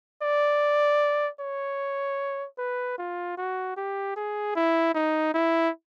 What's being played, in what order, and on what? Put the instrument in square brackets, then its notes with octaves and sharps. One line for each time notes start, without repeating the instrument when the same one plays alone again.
[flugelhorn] D5
C#5
B4
F4
F#4
G4
G#4
E4
D#4
E4